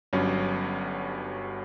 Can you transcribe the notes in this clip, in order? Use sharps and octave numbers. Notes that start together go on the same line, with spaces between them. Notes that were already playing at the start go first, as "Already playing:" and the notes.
G1 G2 F#3 C#4